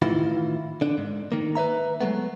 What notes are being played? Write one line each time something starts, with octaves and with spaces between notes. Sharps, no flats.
A2 D#3 E3 E4 F4
D3 D4
G#2
D#3 A#3
B4 C5 E5 A#5
F#3 G#3 A3 B3